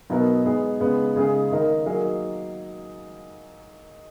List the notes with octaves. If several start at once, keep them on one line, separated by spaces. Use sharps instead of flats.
B2 F#3 B3 D#4 A#4
G#3 B3 D#4 G#4
C#3 G#3 B3 D#4
C#3 G#3 D#4 G#4
D#3 A#3 D#4 A#4
F#3 A#3 D#4 G#4